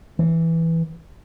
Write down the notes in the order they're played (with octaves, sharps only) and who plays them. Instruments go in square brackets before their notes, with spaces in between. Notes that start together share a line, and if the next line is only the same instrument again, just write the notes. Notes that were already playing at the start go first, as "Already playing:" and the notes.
[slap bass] E3